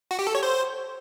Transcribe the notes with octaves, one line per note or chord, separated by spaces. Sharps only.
F#4
G4
A4
C#5
C5